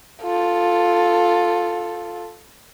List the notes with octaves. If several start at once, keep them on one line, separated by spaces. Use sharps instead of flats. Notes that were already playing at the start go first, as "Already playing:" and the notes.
F4 A4